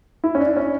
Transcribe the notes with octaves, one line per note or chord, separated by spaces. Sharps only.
E4
C#4
D4
C#4